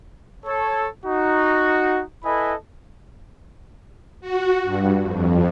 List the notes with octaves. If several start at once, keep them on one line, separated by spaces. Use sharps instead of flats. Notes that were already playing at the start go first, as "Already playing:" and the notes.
A4 C#5
D#4 F#4
E4 A4 B4 D#5 G#5 B5
F#4
G2
F2